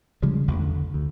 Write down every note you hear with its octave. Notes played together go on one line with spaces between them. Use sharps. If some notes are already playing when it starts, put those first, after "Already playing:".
C#3 F3 G3 G#3
A1 E2 B2
D3
D2